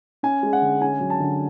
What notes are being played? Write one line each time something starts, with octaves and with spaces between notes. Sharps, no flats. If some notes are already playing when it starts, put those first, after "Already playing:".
C#4 G#5
G#3
F#5
D3
C#4 G#5
F#3
A5
D3